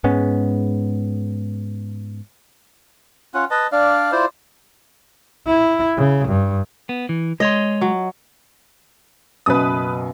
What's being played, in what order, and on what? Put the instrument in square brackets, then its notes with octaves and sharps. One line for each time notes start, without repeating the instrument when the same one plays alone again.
[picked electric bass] G#2 G#3 B3 C#4
[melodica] C#4 F4 F#5
B4 D#5 A5
D4 D5 F5
E4 F4 C5 D5
[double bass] E4
C#3
G2
[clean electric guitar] B3
E3
[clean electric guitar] G#3 C#5 C6 [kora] D#5
[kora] F#3
[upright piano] F#1 F#2 B2 [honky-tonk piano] B4 D#6